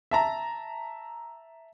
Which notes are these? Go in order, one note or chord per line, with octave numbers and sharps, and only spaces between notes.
E5 A5 A#5